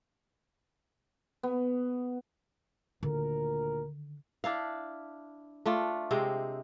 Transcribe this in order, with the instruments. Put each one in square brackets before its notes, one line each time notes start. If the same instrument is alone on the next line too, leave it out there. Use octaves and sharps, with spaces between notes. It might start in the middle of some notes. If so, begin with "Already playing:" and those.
[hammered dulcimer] B3
[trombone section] D2 A#2 A#4 [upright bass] D3 D#3
[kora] D4 E4 F5
A3 D4 F4
C3 G#3 C4